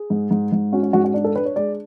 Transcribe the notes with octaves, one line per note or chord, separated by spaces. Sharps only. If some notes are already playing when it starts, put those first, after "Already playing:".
Already playing: G#4
G#2
G#2
G#2
C#4 F#4
F#4
G#2 F#4
F#4
D4
A4
D4 B4
C#5
G#3 D5